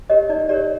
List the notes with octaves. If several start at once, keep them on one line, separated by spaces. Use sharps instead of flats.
G4 A#4 C#5 D#5
D#4 D5
G4 A#4 C#5 D5